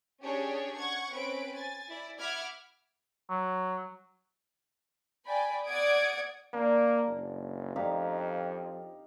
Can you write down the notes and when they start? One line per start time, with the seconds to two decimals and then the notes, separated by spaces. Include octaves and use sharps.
0.22 C#4 D4 G4 G#4 C#5
0.78 F#5 C#6 G#6
1.12 C4 C#4 B4 D7
1.55 G#5 A6
1.89 E4 D5
2.19 E5 F#5 B5 D6 F6 G#6
3.30 F#3
5.26 D5 G5 G#5 B5
5.66 D5 F#5 D#6 G#6 D7
6.53 A#3 D4
7.08 F#1
7.76 F2 D#4 G4 F5